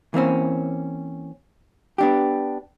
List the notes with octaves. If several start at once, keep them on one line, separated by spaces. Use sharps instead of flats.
E3 A#3 C4 C#4
B3 D4 G4